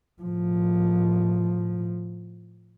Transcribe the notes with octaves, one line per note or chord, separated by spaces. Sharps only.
A2 F3